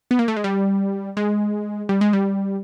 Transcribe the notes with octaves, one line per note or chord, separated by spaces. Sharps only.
B3
A#3
A3
G#3
G3
G#3
G3
G#3
G3